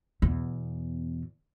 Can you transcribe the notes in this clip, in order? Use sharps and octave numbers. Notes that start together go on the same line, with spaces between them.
E2 B2